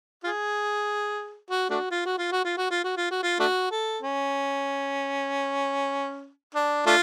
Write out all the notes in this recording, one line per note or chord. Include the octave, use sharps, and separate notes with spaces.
F4 G#4
F#4
A3 D4 F#4
F4
F#4
F4
F#4
F4
F#4
F4
F#4
F4
F#4
F4
A3 D4 F#4
A4
C#4
D4
A3 D4 F4